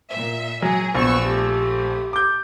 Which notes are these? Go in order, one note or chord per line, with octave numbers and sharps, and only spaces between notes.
A#2 E5
F#3 G#4
A#1 B3 C#6 E6
A3 G4
D6 G6